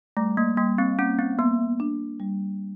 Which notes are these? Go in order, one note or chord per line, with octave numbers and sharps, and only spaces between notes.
G3 A3
A#3
G3 A#3
C4
A#3 C#4
C4
A#3 B3
D4
G3